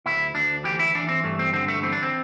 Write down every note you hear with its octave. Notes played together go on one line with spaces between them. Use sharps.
D2 E4
D2 D4
E3 G4
E4
E3 D4
C4
G2 A3
C4
D3 C4
A3
E3 C4
D4
C4